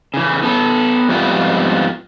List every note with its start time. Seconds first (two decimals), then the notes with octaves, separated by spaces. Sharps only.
0.14 C#3 E3
0.43 B3 A4
1.09 F2 G#2 G3 B3 E4 F4